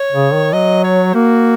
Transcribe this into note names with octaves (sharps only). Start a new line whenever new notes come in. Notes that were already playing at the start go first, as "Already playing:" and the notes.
Already playing: C#5
C#3
D#3
F#3 D#5
C#5
A#3 F#4